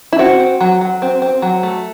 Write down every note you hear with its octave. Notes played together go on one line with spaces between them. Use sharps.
E4
C4 F#4
C4
F#3
F#3
C4
C4
F#3
A3